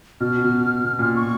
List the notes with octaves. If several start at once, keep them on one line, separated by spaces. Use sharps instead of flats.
B2 F6
B2
B2
A#2
C#6